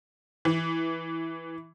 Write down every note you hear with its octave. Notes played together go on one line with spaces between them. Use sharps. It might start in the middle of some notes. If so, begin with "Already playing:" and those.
E3